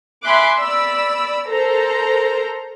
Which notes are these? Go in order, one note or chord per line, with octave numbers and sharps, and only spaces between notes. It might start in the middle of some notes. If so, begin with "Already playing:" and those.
E5 G#5 B5 C6 D6 F#6
D5 B5 E6
A4 A#4 C5 A#5